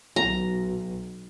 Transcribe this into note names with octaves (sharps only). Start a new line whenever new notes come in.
B1 A#5